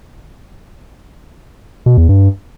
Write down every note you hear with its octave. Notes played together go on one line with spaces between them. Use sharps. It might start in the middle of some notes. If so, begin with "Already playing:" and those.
B2
E2
G2